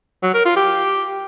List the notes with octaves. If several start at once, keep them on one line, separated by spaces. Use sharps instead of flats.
F#3
A#4
F4
G4